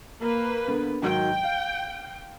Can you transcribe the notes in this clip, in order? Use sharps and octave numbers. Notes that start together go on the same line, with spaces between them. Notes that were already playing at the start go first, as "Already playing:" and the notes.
A#3 B4
D3 B3
G#2 D#3 F#3 G5
F5